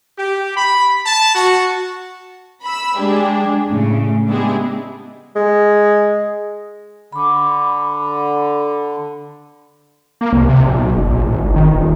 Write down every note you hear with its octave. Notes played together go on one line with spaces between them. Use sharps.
G4
B5
A5
F#4
B5 E6
G#3 D4 G4 G#4
A2 C#3
G#3 B3 D4 E4 G4 G#4
G#3
D3 B5 D6
A#3
C2
C3
A#1
B1
F#1
A#1
G#1
G1
D#3
D#1